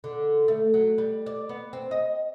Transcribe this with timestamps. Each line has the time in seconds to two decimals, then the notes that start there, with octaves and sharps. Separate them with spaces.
0.04 D3
0.48 A3
0.74 F#3
0.98 G3
1.26 D5
1.49 B3
1.73 C4
1.91 D#5